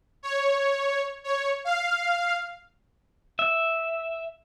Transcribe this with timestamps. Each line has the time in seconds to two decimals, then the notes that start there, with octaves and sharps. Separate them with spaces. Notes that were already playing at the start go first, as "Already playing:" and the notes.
0.23 C#5
1.24 C#5
1.64 F5
3.39 E5